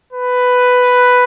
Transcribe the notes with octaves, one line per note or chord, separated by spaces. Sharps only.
B4